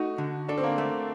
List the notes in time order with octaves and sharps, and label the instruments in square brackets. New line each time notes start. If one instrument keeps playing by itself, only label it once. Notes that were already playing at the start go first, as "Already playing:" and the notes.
Already playing: [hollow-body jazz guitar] A3 D#4 [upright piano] F#4
[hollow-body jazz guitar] D3
[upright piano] D4 [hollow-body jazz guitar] A4
[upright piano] C4
A#3
[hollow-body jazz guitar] A3